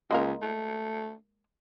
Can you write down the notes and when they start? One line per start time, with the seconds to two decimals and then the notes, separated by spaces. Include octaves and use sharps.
0.11 C#2 G#3 A#3 A#4
0.42 A3